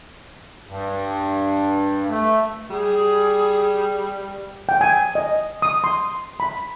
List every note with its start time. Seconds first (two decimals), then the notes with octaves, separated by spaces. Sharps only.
0.68 G2
2.09 A3
2.70 G3 G#4
4.69 G5
4.81 G#5
5.15 D#5
5.62 D#6
5.84 C6
6.40 B5